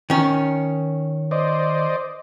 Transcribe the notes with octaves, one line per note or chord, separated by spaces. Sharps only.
D#3 C#4
C5 D5 D#5